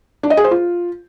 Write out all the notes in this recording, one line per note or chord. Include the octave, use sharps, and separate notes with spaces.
D4
D#5
G#4
C5
F4